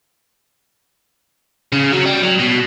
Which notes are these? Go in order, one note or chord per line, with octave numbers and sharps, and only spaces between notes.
C#3
F#3
G3
F#3
B2